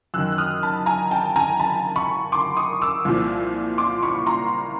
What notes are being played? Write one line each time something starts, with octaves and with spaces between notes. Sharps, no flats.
F#2 D#3 E6 F#6
F#6
D#6 F6
A5 B5
G#5 A#5
G5 A5
G#5 A#5
A5 B5
B5 C#6
C6 D6
C#6 D#6
D6 E6
C2 A#2 F3
C6 D6
B5 C#6
A#5 C6